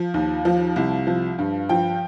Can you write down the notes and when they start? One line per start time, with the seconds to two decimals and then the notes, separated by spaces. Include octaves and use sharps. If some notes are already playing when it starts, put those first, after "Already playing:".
Already playing: F3
0.14 D#2
0.45 F3
0.76 C2
1.07 F3
1.39 G2
1.69 F3 G5